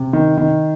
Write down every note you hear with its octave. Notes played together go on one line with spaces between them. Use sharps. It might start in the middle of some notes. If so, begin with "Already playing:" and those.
Already playing: C3
D#3
D#3